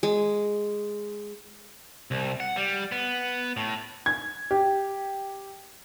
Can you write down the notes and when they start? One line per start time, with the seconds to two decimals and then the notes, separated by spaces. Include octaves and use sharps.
0.03 G#3
2.11 C2
2.40 F#5
2.57 G3
2.92 B3
3.57 A2
4.06 G#6
4.51 G4